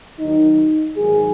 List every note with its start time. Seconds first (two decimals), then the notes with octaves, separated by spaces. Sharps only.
0.19 D#2 D#3 F#3 D#4
0.97 G#2 D#3 F#3 G#4